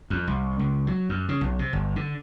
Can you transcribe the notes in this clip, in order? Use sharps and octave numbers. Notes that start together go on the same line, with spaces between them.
F2
C2
C#2
F#3
F#2
C#3
B1
C3
G1
D3